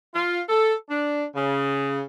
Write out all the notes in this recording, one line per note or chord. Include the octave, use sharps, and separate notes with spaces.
F4
A4
D4
C#3